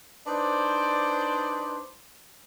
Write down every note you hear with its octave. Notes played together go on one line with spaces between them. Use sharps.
D4 D#4 B4 C5 D5